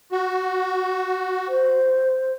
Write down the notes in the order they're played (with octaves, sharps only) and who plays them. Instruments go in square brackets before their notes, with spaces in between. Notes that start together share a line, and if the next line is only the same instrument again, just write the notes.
[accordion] F#4
[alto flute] C5